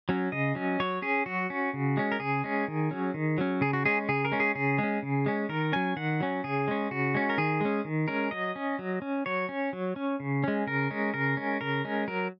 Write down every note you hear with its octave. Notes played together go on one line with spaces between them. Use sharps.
F#3 C#4
C#3 D#5
F#3 C#4
F#3 C#5
C#4 G#4
F#3 F#4
C#4
C#3
G#3 C#4
A#4
C#3 G#4
G#3 C#4
D#3
F#3 C#4
D#3
F#3 C#4
C#3 G#4
F#4
G#3 C#4 G#4
C#3 G#4
A#4
G#3 C#4
G#4
C#3 G#4
G#3
C#4
C#3
G#3 C#4
D#3 A#4
F#3 C#4 G#5
D#3 F#5
F#3 C#4
C#3 G#4
G#3 C#4
C#3 F#4
G#3 C#4
A#4
D#3 G#4
G#3 C#4
D#3
G#3 C#4 A#4
F#3 D#5
C#4
F#3
C#4
F#3 C#5
C#4
F#3
C#4
C#3
G#3 C#4
C#3 A#4
G#3 C#4
C#3 A#4
G#3 C#4
C#3 A#4
G#3 C#4
F#3 A#4